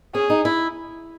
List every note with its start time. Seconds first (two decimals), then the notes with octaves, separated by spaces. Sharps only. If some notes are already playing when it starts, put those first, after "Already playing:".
0.14 C#4 G#4
0.30 D#4
0.45 E4